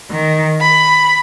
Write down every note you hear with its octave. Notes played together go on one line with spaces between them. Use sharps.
D#3
B5